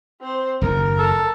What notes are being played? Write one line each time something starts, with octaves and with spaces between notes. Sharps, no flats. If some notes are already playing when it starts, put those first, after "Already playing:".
C4 C5
F#1 D#2 A#4
A4